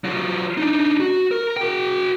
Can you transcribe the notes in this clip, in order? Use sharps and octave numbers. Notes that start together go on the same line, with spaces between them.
F#3 F4
D4 D#4
F#4
A#4
F#4 G5